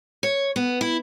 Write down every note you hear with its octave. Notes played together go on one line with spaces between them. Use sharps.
C#5
B3
E4